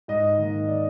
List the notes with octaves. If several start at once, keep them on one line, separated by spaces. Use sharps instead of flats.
G#2 D#5
D#3 A#3
D5